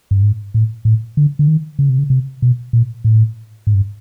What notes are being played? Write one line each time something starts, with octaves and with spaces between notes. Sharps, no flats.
G2
G#2
A2
A2
D3
D3
D#3
C#3
C3
C#3
C3
B2
A#2
A2
G#2
G2